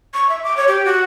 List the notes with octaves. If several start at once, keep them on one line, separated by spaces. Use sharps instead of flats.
C#6
E5
D6
C#5
G4
F#4